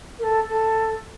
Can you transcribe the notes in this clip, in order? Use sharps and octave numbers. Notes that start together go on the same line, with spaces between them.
A#4
A4
A4